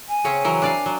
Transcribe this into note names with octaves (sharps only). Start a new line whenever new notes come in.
G#5
C#3 C4 C#4
E3 F#3 A#4
D4 D5 F5
F#3